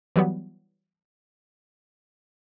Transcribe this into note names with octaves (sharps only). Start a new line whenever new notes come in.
E3 F#3 G3 B3